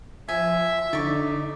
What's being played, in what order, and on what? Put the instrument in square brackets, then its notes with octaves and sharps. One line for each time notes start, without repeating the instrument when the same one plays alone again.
[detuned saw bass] F3 [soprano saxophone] E5 [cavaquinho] G#5
[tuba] D3 [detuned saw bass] D#4 [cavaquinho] D5 C#6